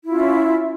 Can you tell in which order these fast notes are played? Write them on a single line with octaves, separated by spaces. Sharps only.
E4 F4 C#4 E5